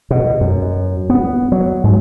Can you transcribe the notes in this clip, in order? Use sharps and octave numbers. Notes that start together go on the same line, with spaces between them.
B2
F#2
B3
F#3
G#2